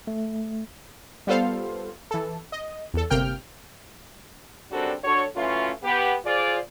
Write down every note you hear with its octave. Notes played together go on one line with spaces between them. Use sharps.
A3
G3 B3 F4 A4 C5 F5
E3 A4
D#5
E2 A4
G1 C3 A#3 G5 F6
F#2 G3 C4 D4 F#4 A4
D4 F#4 A4 C#5
E3 F#3 A3 C#4 F4
B3 G4
F4 G#4 C5 D5